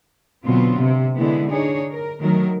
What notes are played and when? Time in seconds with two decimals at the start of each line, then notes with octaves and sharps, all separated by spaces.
0.45 B2 D3 F#3 B3 C4 F4
0.78 C3
1.17 D3 E3 G#3 B3 E4
1.50 D4 D#4 G#4 C#5
1.91 A#4
2.20 D#3 F#3 A3 A#4